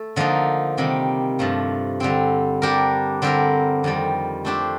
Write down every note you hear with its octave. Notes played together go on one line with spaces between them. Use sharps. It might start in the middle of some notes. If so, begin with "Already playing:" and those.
Already playing: A3 A4
D3 F3 A#3 D#4
C3 D#3 G3
G2 F3 A3
D3 G3 C4
G3 D4 G4 A#4
D3 G3 C4 G4 A#4
F2 D#3 G3
A3 D4 G4 C5